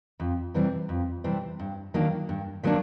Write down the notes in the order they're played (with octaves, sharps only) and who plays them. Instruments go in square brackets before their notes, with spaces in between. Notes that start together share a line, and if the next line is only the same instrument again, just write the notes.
[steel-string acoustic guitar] F2
C3 E3 G3 C4
F2
C3 E3 G3 C4
G2
D#3 F#3 A#3 D4
G2
D#3 F#3 A#3 D4